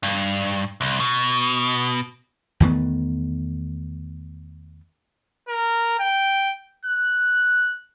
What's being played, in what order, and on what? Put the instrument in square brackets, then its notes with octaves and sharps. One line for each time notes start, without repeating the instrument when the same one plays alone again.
[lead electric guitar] G2
C2
B2
[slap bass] E2 D#3 A3 B3
[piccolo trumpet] A#4
G5
F#6